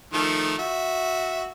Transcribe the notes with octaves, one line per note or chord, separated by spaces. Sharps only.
D#3 F3 A3
F#4 E5